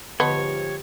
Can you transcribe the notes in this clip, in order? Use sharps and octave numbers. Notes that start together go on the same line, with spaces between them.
G#2 D3 F3 B3 G4 C#5 D#5 A5